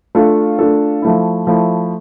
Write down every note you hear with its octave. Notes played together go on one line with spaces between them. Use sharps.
A3 D4 F4 A4
A3 D4 F4 A4
F3 A3 E4
F3 A3 E4